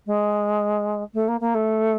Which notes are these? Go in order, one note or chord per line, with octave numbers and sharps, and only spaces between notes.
G#3
A3
A#3
A#3
A3